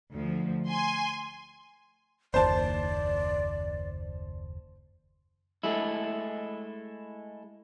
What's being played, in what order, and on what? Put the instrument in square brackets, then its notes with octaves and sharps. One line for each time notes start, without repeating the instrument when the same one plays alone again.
[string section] D2 F3
G#5 C6
[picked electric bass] F#1 D#2 [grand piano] C5 A5 [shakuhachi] D5
[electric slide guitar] G#3 A3 E4